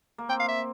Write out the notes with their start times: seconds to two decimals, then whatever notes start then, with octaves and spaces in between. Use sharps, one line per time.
0.18 A#3
0.29 C4 G5
0.40 F5
0.49 E5